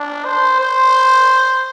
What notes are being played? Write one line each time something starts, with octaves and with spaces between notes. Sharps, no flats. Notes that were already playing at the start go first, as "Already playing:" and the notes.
Already playing: D4
C5
C5